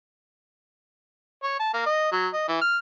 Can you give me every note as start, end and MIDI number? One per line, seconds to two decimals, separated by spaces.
1.43 1.58 73
1.59 1.71 81
1.74 1.85 58
1.86 2.11 75
2.12 2.28 54
2.33 2.45 75
2.48 2.58 52
2.61 2.78 89